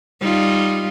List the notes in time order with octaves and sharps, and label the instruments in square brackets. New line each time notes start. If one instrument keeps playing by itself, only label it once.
[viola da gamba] G3 D#4 F4